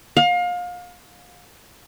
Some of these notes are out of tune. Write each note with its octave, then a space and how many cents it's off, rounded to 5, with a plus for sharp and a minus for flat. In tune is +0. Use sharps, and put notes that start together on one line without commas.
F5 +30